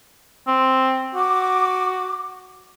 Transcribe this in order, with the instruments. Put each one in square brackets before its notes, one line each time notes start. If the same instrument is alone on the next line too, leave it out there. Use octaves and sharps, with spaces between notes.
[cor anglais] C4
[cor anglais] F#4 [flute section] D6